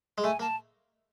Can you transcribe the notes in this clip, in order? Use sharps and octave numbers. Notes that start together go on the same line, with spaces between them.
G#3
A3 G#5
A#3 A5